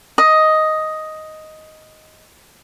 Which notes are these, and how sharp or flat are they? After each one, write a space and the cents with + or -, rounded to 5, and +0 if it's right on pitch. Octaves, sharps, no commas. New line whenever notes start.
D#5 +5